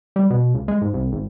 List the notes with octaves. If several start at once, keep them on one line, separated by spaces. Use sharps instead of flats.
G3
B2
C#2
G#3
G#2
C2
G#1